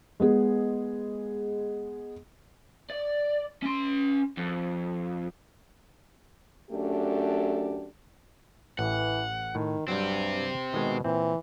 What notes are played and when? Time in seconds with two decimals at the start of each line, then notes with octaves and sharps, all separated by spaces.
0.20 G#3 B3 G#4
2.90 D5
3.63 C#4 C6
4.37 F2
6.70 F#2 A3 D4 G4
8.79 A1 E3 F#5
9.55 A2 D#3
9.88 G2 F#3 G3 C4 G4
10.74 B2 D#3 G#3
11.05 A#2 E3 C4